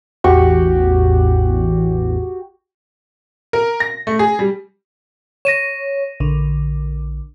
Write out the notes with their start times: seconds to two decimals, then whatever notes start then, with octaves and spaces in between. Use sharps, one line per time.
0.24 A1 E2 F#4 G4 C#6
3.53 A#4
3.80 A#6
4.07 A3
4.19 G#4
4.39 G3
5.45 C#5 A#6 D#7 E7
6.20 A#1 D3